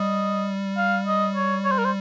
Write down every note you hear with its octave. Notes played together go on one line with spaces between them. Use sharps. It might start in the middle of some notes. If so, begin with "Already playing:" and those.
Already playing: G3 D#5
F5
D#5
C#5
C#5
C5
A#4
C5